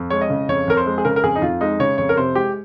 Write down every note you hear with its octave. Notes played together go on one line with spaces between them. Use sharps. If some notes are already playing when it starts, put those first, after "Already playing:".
Already playing: F2
G#3 C#5
D#5
C#3
F2 C#5
F2 A#4
C5
G#3
G#4
C#3 A#4
A#4
F2 G#4
D#4
F2 F4
G#3 D#4
C#3 C#5
F2 C#5
A#4
C3 C5
G#3 G4